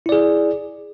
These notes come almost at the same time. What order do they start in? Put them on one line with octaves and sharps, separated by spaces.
E4 D5 G#4